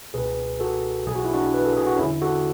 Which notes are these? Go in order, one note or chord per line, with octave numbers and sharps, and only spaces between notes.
C#2 B2 G#4 B4
F#4 A4
B1 B2 G#4
F#4
E4
D4 F#4
B4
A4
G#4
F#4
E2 C#4 E4
D3
F#4 A4